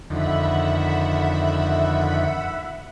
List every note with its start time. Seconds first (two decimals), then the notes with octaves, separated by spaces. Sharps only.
0.10 F2 D3 D#3 E5 F#5 B5